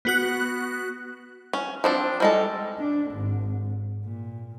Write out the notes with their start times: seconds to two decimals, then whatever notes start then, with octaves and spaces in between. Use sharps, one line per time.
0.05 B3 F#4 F#6
1.53 C#4
1.84 F3 C4 D4
2.20 G3 G#3 A4
2.78 D4
3.12 G#1
4.05 A#2